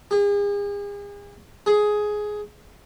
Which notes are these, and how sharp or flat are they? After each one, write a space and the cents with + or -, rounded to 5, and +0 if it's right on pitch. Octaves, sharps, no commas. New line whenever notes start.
G#4 -40
G#4 +10